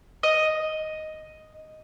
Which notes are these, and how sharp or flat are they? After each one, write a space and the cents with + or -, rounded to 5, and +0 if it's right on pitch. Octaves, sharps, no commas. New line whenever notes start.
D#5 +0